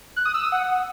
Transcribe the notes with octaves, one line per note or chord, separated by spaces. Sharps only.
F#6
D#6
E6
D#6
F#5